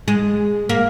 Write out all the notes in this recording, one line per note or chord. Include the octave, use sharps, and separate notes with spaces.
G#3
A#3